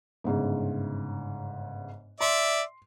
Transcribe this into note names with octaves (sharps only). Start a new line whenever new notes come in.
G1 G#2 C#3
D5 E5 C6